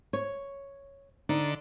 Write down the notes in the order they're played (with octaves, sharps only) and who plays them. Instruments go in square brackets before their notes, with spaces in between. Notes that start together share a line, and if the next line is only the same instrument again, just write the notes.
[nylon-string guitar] C#5
[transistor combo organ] D3 [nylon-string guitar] D#4